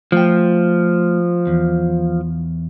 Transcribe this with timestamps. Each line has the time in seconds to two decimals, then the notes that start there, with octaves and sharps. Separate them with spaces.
0.12 F3 A3 G5
1.47 E2